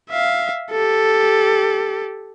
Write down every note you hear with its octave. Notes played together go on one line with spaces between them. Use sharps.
E5 F5
G4 A4